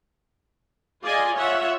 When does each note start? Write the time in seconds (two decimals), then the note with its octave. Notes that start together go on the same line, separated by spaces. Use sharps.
1.03 F4 G#4 D5 D#5 G#5
1.35 F4 C#5 E5 F#5